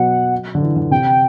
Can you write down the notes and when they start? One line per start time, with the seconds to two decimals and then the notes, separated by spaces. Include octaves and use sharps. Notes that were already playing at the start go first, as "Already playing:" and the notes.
Already playing: B2 F#3 F#5
0.55 D3
0.62 E3
0.76 D3
0.91 C3 G5